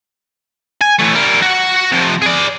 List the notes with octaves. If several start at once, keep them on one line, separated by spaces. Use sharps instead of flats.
G#5
E3 A3
G3 A#4
F#4 F#5
C3 F3
G#4 D5